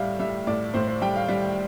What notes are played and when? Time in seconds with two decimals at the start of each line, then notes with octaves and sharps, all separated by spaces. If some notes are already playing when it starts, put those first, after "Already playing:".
Already playing: A2 G3 E5 F5
0.19 G3 E5
0.47 A2 D5
0.74 A2 C5
0.88 C5
1.02 G3 G5
1.16 F5
1.28 G3